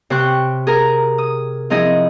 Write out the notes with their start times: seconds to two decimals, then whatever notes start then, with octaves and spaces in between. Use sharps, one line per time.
0.10 C3 C5 G5 C#6 F#6
0.67 G#4 A#4 A#5
1.18 D#6
1.70 F3 C4 D#4 E4 G#4 D#5